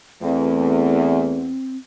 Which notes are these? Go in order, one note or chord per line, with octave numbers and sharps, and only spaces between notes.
E2 A3 C4